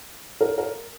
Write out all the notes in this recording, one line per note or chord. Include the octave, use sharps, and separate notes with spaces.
A#4
A#4